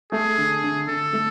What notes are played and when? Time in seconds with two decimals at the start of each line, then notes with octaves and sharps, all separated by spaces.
0.12 A3 G#4
0.38 D3
0.63 D3
0.88 D3 A4
1.13 A3